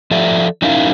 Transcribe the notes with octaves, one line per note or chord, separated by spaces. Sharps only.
F3 A4 D5 E5
F#3 C#4 D#4 E4 A#4 F5